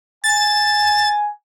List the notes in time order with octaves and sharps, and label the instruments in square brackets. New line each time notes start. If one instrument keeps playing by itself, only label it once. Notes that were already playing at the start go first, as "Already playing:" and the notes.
[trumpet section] G#5 [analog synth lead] A6